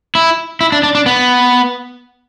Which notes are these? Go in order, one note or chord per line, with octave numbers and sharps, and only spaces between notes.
E4
E4
D4
D4
D4
B3